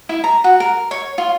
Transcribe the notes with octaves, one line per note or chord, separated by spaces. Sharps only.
E4
A#5
F#4
A#4
C#5
F4